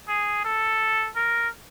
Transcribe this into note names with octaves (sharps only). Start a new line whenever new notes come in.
G#4
A4
A#4